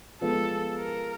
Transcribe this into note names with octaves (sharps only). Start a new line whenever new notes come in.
F3 G#3 B3 A4
A#4